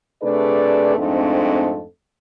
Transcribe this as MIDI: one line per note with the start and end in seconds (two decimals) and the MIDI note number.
0.23 0.95 48
0.23 0.95 57
0.23 0.95 62
0.23 0.95 68
0.23 0.95 71
0.23 0.95 74
0.97 1.83 41
0.97 1.83 44
0.97 1.83 57
0.97 1.83 60
0.97 1.83 62
0.97 1.83 69